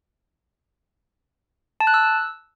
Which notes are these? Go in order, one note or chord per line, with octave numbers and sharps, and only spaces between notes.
A5
F#6
E6